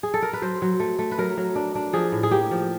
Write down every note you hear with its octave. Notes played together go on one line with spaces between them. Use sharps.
G#4
A4
A#4
B4
F#3 C5
F#3
A3
A3
B4
F#3 A#4
F#3
D4
D4
F3 G#4
A2
G#4
A#3 G4
F3